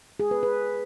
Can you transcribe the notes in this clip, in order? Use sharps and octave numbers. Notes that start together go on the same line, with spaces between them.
G#4
B4
B4